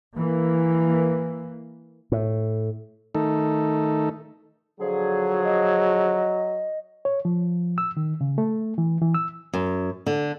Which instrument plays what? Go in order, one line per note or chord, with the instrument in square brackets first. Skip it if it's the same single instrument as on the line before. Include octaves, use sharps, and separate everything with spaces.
[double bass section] E3 A#3
[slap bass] A2
[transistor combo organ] D#3 A3 D#4 A4
[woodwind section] D3 F3 G#4 [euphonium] F#3
[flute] D#5
[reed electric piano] C#5
F3
E6
D#3
C#3
A3
E3
E3
E6
[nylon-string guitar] F#2
D3